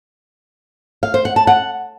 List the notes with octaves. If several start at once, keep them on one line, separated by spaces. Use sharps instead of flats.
F5
C5
F#5
A5
F#5